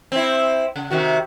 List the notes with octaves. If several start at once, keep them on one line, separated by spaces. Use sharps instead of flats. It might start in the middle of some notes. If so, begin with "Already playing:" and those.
C4 E4
C#3
C3 D#3 F#4